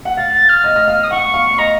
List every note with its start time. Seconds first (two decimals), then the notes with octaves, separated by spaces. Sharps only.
0.05 F#5
0.17 F5 A6
0.33 A6
0.49 F6
0.64 D#5
0.76 D#5
0.88 F5
1.03 D#6
1.11 F#5 C#6
1.34 F5
1.58 D#5 A#5